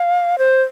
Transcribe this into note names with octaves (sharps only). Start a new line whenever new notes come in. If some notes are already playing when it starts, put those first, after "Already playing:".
Already playing: F5
C5